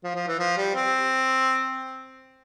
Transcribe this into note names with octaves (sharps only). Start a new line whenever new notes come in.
F3
F3
E3
F3
G3
C4